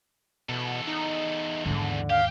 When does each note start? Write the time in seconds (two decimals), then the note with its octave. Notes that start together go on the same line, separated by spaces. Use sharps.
0.49 E2 B2 A4
0.87 D#4
1.66 D#2 G#2 D3
2.10 G4 F5